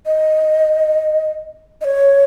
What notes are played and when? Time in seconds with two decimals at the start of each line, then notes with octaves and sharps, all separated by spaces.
0.06 D#5
1.81 D#5
1.85 C#5